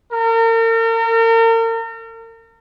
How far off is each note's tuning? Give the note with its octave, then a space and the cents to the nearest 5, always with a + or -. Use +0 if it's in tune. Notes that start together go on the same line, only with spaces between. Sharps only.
A#4 -40